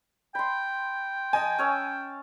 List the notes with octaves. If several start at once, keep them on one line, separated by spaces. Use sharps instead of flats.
G5 B5 C6
D#5 G#5 A5
C#4 C#5 E6